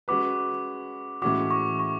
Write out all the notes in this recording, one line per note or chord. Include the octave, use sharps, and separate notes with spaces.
G#3 C#4 F#4 B4 D6
A2 E3 G#3 C#4 F#4 D6
C#6
C#6